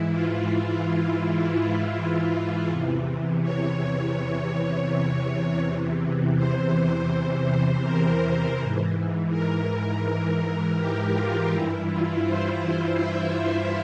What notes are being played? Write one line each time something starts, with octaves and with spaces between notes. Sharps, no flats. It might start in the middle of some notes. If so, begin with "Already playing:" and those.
Already playing: G#2 E3 E4
F4
F4
E2 C3 E3
C#5
C#5
E2 C3 E3
C5
A#4
G#2 E3
A#4
G4
F4
G2 E3 E4
F4
C5
E5